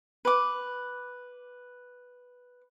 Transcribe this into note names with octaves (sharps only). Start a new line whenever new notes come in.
B4 D6